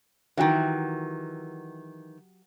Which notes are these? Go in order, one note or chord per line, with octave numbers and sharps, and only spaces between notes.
D#3 E3 F#3 F#4 G4